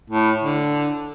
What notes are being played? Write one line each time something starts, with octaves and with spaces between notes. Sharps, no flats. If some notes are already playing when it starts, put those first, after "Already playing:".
A2
D3